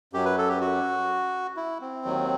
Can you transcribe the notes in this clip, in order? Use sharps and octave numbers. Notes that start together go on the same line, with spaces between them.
F#2 F#3 G4
B4
A4
G4
F#4
E4
C4
D#2 D#3 F#3